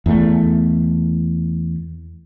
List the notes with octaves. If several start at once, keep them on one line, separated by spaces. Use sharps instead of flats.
E2 A3